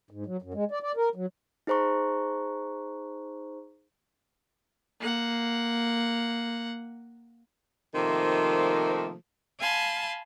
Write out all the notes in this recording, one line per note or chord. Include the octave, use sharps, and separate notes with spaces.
G#2
F#3
F#2
G#3
D5
D5
A#4
F#3
D#4 G#4 C5 A#5 C#6
A#3 F#5
C3 D#3 F3 A3 A#3
F5 G#5 A5 B5 C6